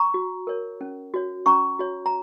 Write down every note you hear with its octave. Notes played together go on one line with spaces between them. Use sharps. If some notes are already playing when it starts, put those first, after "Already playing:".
Already playing: A#5 C#6
F#4
A#4 C#5
C#4
F#4 C#5
C#4 A#5 C#6
F#4 C#5
A#5